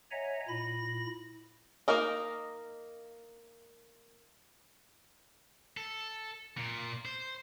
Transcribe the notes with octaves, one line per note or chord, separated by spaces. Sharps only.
C#5 D#5 E5 F#5 G#5 A#5
A#2 E4 B5 A#6
A#3 D#4 A#4 D#5
A4
A#2
C5